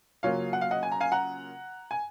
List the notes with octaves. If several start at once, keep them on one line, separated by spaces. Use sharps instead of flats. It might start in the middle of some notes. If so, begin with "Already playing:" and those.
C#3 F#3 A#3 C#4 F4 C#5 F5
F#5
F5
D#5 F#5
G#5
A#5
F5 G#5
F#5 A#5
G#5